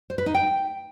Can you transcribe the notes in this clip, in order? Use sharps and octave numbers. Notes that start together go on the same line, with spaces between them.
C5
B4
D#4
G5